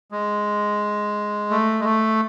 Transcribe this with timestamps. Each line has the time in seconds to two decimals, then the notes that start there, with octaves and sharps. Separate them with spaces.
0.11 G#3
1.50 A3
1.80 G#3
1.85 A3